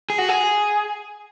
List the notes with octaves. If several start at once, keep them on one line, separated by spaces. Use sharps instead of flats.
G#4
F#4
G#4